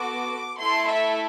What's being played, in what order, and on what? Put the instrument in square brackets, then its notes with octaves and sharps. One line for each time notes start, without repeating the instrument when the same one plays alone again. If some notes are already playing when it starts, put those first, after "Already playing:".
Already playing: [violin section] B3 F#4 A4 D6
A3 E4 A4 C6
E5